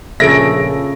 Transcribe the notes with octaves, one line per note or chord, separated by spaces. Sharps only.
A#1 C#3 G#4 A4 E5 A#6 D7